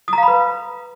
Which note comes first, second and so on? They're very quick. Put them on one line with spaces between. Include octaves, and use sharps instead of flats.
D#6 A#5 F5 B5 B4